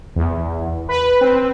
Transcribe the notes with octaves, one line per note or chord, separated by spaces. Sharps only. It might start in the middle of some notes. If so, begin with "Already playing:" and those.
E2
B4
C4